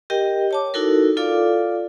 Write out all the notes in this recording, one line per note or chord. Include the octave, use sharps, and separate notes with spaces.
G4 A#4 D#5 G5
C#5 A5 D6
D#4 E4 F#4 A4 A#4
F4 A4 D5 F5 D6